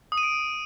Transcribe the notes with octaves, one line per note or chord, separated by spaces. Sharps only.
D#6
D#7
D7